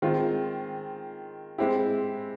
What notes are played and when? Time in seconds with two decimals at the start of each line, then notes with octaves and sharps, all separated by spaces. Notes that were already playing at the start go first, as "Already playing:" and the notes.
0.02 D#3 G#3 C4 F4
1.58 G#3 C4 E4 G4